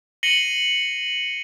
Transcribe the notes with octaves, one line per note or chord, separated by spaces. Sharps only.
A#6 C7 C#7 D#7 F#7 G7